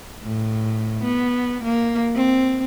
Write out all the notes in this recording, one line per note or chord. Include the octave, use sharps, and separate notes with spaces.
A2
B3
A#3
C4